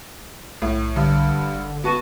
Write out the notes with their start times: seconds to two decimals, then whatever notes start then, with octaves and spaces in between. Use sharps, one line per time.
0.62 B1 A2
0.96 G2 D3
1.41 G1
1.84 B3 F#4 A5 D#7